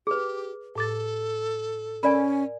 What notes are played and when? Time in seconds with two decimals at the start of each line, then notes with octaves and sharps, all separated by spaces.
0.07 G4 G#4 B4
0.75 A2 A4 D6 A6
2.03 C#4 A#4 D5 G#5 B5